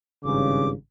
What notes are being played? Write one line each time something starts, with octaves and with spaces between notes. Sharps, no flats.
G#1 G2 C#3 D6